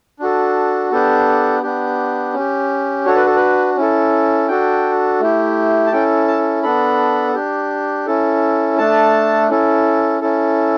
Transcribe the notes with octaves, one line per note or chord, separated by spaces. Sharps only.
D4 F#4 A4
B3 D4 G4 A4
B3 D4 G4
C#4 G4
D4 F#4 A4 C#5
B4
A4
B4
C#4 E4 A4
D4 F#4 A4 G5
A3 E4 G4
A5
C#4 E4 A4 G5
A5
B3 D4 A4 B5
D4 G4
C#4 E4 A4
A3 D4 A4 A5
C#4 E4 A4
C#4 E4 A4